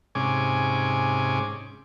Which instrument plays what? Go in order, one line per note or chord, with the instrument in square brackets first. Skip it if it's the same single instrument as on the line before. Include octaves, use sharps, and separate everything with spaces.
[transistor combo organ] G#2 C3 C#4 G#5 D6